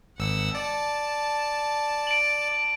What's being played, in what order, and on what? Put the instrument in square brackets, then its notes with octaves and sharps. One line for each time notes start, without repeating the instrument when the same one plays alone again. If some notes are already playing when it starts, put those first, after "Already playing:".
[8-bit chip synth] G#1 E6 [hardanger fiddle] F#5
[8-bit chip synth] D5 [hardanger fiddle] A5
[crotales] D7 F#7